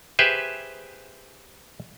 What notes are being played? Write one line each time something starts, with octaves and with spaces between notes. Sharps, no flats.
G4 G#4 B4 C5 E5